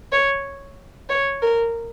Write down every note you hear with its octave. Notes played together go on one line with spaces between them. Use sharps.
C#5
C#5
A#4